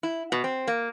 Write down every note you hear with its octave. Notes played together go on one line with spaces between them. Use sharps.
E4
B2
C4
A#3